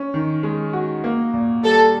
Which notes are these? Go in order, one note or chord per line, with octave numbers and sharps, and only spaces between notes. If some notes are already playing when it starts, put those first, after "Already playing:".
Already playing: C#4
D#3
G#3
F#4
A#3
A#2
G3 A4